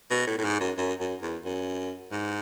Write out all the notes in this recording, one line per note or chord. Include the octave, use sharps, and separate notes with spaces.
B2
A2
A2
G#2
F#2
F#2
F#2
E2
F#2
G#2